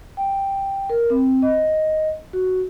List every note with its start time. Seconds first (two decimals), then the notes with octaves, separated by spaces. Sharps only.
0.17 G5
0.90 A#4
1.10 C4
1.42 D#5
2.33 F#4